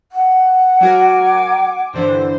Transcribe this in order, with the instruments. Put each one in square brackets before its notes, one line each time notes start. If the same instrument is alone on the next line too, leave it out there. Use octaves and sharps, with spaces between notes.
[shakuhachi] F#5
[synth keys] F#3 F#4 A#4 [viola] G#5 D6
[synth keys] G2 D3 E3 [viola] C5